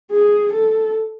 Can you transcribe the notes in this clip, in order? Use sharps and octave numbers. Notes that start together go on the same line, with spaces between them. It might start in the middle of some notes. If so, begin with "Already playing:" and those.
G#4
A4